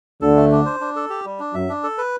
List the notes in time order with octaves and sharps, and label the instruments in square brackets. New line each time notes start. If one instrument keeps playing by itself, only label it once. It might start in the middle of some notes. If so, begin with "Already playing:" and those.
[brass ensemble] D2 D3 [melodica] A4
[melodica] A3
D4
C5
D4
A4
G4
G3
D4
[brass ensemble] F#2 F#3 [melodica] E5
[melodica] D4
A4
B4